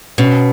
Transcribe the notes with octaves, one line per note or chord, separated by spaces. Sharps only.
B2 C#4